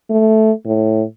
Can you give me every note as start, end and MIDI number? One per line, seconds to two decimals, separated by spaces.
0.10 0.52 57
0.65 1.03 45